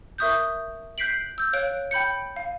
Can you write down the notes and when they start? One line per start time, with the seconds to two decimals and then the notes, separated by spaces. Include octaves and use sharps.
0.18 A#4 E5 C#6 D#6 F#6 G6
0.98 F#6 G6 B6 C7 D7 F#7
1.38 E6 G6
1.53 C#5 F5 F#6 D7
1.91 G5 B5 G6 C#7
2.36 F5